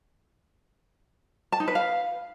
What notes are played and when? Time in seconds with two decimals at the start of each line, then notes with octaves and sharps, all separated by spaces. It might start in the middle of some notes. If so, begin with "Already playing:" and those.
1.52 A5
1.60 D#4
1.68 B4
1.75 F5